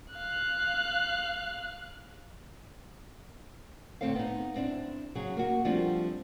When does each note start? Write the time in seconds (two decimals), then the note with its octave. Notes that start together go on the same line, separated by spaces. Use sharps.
0.14 F5 F#6
4.01 A2 D3 C4 A4 C5 F5
4.15 B3 D#4
4.56 C4 D4 E4
5.15 C#3 F#3 G#4
5.37 A#3 F#4
5.65 F3 G3 A3 C4 D4 F4